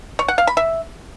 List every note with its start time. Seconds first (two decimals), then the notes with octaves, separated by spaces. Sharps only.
0.19 C#5
0.28 F#5
0.38 F5
0.47 B5
0.57 E5